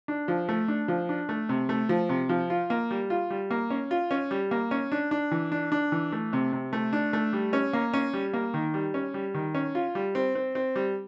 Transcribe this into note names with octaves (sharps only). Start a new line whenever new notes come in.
D4
F3
A3
D4
F3
D4
A3
C3
A3
F3
C3
F3
F4
A#3
G3
F4
G3
A#3
C#4
F4
C#4
G3
A#3
C#4
D4
D4
E3
D4
D4
E3
A3
C3
C3
A3
D4
A3
G3
C#4
A#3
C#4
G3
A#3
D#3
G3
C#4
G3
D#3
C#4
F4
G3
C4
C4
C4
G3